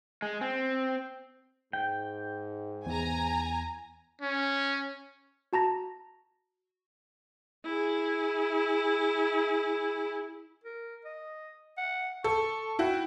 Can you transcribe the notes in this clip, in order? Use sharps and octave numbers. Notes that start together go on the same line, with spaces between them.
G#3
C4
G#2 G5
E2 G#5 A#5
C#4
F#4 A5 A#5 A#6
E4 G#4
A#4
D#5
F#5
A4 C#6
E4 F#4 G5